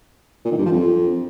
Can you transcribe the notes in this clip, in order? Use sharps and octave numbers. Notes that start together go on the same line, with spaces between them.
A#2
D#3
G2
F3
F2